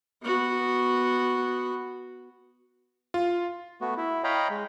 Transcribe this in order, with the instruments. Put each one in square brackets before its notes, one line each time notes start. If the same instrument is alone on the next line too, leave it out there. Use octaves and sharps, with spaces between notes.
[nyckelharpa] B3 F#4
[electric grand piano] F4
[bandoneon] A3 B3 F#4
E4
C#5 D#5 F5 G5 A#5 B5
G#3